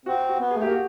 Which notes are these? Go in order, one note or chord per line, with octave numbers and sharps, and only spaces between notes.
C4 F#4
F#4
B3
G#4
A3
A#3 G4
F#4